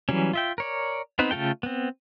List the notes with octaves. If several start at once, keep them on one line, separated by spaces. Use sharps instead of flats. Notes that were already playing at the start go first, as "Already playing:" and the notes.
E3 F#3 G3 C#4
F4 E5 G5
A#4 C#5 D5
B3 C4 D#4 B4
C#3 A3 F4 A4 G5
B3 C4